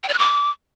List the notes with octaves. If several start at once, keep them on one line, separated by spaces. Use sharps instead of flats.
G5
D5
F#6
D6